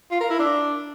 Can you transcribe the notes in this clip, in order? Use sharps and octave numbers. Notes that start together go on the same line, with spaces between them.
F4
A#4
E4
D4